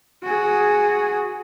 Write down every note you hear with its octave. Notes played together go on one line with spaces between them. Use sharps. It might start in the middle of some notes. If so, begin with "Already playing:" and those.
F#4 G#4